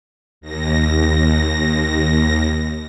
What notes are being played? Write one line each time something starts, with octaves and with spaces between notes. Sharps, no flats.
D#2 A#6